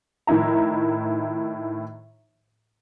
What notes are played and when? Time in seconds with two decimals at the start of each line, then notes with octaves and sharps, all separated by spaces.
0.27 A2 D#3 F3 E4 A#5